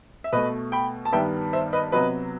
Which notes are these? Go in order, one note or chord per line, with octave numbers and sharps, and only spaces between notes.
E5
B2 A3 B4 D#5
G5 B5
A5
G2 D#3 G3 B3 E5 G5
C5 E5
B4 D#5
C3 F#3 B3 B4 D#5